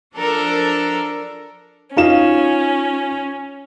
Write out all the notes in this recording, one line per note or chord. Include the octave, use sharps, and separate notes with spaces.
F3 D4 A4 A#4
C#4 D#4 F4 E7